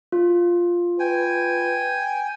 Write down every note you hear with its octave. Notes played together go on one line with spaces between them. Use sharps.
F4
B4 G5 G#5